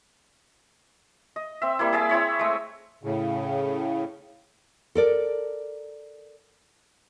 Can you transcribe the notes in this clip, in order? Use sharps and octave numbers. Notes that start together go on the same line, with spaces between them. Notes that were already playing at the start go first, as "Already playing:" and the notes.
D#5
C4 E5
G3 A#3 E4
G#4 D5 E5 A5
C4 E4 C#5 B5
G#3 A3
A2 C#3
A4 A#4 D5